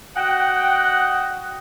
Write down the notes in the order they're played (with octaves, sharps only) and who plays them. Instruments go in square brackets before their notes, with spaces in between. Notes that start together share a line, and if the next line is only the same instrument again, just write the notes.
[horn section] F#4 D#5 F#5 G5